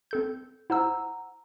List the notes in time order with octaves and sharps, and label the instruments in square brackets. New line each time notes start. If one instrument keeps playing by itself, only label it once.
[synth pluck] C4 A4 G6
[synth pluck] E4 C5 E6 [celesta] F#5 A#5